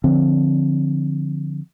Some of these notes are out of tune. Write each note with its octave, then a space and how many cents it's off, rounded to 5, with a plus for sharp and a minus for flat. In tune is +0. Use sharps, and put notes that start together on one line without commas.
D3 +0 F3 +0 C4 +0